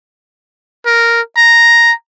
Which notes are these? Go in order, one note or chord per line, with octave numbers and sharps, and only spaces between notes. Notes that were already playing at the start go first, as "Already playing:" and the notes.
A#4
A#5